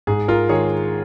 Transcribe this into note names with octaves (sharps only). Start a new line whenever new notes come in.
G#2 G#4
F4 A#4
D#3 G#3 G#4 C#5